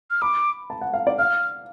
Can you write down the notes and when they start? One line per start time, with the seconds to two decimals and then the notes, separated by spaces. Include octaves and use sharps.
0.10 F6
0.22 B5 D6
0.70 A5
0.81 F#5
0.93 F5
1.07 D5
1.19 F5 F6